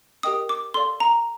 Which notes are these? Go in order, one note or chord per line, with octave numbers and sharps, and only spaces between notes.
G4 A#4 D#5 G5 D#6
D6
A4 D5 F5 C6
A#5